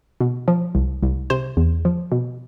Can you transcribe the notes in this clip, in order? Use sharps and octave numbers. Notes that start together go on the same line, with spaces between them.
B2
F3
C2
C2
C3 C5
E2
F3
B2